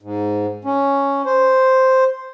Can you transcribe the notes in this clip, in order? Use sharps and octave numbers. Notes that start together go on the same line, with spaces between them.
G#2
C#4
C5